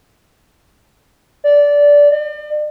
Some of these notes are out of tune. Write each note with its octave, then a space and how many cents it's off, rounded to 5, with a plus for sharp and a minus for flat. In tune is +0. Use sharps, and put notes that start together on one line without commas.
D5 -15
D5 +40